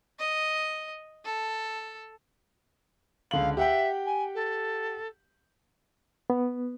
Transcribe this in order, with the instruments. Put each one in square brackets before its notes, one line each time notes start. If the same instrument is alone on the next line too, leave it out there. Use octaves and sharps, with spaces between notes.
[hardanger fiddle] D#5
A4
[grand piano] C#2 D3 F#7 [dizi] F5
[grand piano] G4 F#5 G5 [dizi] E5
[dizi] G#5
A4
[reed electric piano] B3